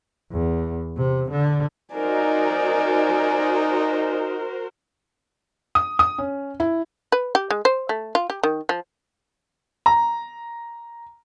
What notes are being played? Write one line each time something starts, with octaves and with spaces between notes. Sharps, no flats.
E2
C3
D3
D#4 F#4 A#4 C5 D5 G#5
D#6
D#6
C#4
E4
B4
G4
G#3
C5
A3
F4
G4
D#3
F3
A#5